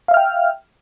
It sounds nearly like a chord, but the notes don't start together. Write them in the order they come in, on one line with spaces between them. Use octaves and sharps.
F5 E5 F6 G5